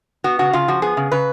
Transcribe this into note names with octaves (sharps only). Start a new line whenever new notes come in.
B3 F#4
C#3 F#4
C#3 F4
F3 F#4
B3 G#4
C#3
C#3 B4